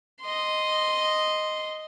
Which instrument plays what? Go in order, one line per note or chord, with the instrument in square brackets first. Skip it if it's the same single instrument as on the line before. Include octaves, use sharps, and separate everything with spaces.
[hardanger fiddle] D#5 C6